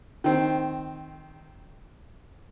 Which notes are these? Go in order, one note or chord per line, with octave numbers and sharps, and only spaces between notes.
D#3 C4